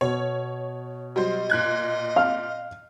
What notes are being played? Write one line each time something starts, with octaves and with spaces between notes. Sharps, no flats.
B2 C#5
F#3 G3 C5 D#5
A#2 F#6 G#6
F5 F6